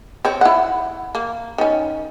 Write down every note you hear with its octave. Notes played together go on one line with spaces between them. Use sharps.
C4 C#5
E4 F#5
A#3
D#3 C#4